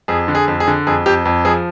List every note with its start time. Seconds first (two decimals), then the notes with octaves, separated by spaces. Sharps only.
0.08 F2 G#4
0.28 D3
0.35 G#4
0.48 F2
0.60 G#4
0.68 D3
0.87 F2 G#4
1.06 F2 G4
1.25 F2
1.45 F3 G#4